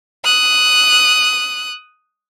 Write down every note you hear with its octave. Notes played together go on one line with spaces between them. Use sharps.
D#6 F#6